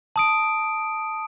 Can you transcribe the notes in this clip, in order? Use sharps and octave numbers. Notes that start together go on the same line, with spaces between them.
A5 D#6 D7